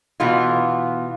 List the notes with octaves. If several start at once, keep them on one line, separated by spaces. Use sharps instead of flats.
B2 E3 B3 F4